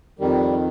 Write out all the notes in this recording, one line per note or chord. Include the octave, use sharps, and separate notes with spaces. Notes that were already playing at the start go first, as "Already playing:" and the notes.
F2 D#3 G3